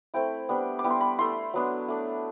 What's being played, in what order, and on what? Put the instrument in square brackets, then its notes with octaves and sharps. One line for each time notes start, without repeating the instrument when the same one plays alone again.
[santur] A3 C4 E4 G5
G3 B3 D4
D6
G3 B3 E4
C6
B5
A3 E4 C6
F#3 B3 D4
A3 D4